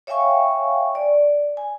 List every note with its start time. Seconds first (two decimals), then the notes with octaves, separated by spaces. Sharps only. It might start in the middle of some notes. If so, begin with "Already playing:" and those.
0.07 C#5 E5 F5 G5 G#5 C#6
0.95 D5
1.57 G#5